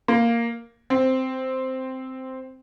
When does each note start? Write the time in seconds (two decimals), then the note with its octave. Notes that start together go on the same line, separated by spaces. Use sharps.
0.08 A#3
0.90 C4